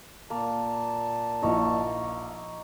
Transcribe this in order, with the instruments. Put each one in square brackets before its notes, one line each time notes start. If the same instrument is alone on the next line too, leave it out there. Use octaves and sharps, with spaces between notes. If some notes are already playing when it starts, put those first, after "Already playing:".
[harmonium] A#2 A5 [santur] A#3
[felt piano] A#1 E4 [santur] D#4 C#5